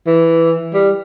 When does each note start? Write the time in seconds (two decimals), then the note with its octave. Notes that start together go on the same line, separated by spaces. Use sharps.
0.07 E3
0.74 G3